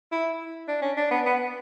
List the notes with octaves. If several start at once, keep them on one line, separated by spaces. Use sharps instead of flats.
E4
D4
C#4
D4
B3
B3